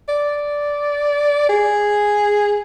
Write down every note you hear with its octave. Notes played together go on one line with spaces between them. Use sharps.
D5
G#4